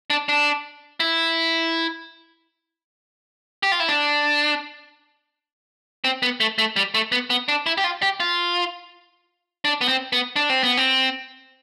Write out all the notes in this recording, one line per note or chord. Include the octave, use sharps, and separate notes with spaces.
D4
D4
E4
G4
F4
E4
D4
C4
B3
A3
A3
G3
A3
B3
B3
D4
E4
G4
F4
G4
F4
D4
B3
C4
B3
D4
C4
B3
C4